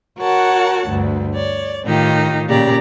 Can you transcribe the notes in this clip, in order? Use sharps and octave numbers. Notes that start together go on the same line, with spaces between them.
F#4 A#4 C#5 F#5 A5
D2 G2
C#5 D5
A2 D#3 D#4 F4 G4
A#2 C#3 G4 D5 A#5